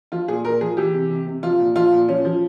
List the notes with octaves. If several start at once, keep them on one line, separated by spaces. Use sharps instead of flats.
F3 F4
A#2 G#4
A#2 A#4
F3 G#4
E3 G4
C3
C3
C3
F3 F4
A#2
F3 F4
A#2
F3 C#4
F3